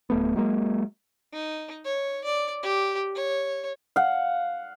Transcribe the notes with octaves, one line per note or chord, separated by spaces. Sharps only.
D1 A3 B3
F#3 G#3 A#3
D#4
C#5
D5
G4
C#5
F5 F#5